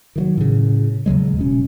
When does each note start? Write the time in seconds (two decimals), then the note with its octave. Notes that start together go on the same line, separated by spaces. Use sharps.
0.16 D#3 E3 F#3
0.37 A2 C#3
1.06 D#2 C#3 F#3 G#3
1.37 D#1 B2 C#4